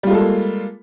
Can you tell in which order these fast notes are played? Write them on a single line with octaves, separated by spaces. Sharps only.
G3 F4 G#3 A4 A#3